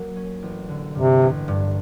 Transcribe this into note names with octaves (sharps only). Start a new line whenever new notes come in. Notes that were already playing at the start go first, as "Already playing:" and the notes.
Already playing: F#3 A#3
C#4
A1
D3
G2 C3
A1
G2